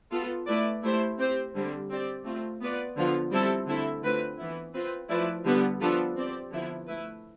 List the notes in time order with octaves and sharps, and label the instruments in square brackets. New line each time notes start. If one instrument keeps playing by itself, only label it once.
[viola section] B3 F4 A4
A3 E4 B4 D5
A3 E4 G4 C5
C4 G4 C5
D3 G3 C4
C4 G4 D5
A3 C4 F4
B3 F4 B4 D5
D3 F3 B3 F4
G3 C4 E4 A4
D3 A3 C4 E4 A4
D3 A3 C4 F4 B4
E3 B3 E4
C4 F4 B4
F3 A3 E4 B4 D5
D3 G3 B3
F3 B3 D4 F4 A4
C4 G4 D5
D3 F3 B3 E4
A3 E4 B4